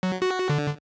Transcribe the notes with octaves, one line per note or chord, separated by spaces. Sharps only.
F#3
F#4
D3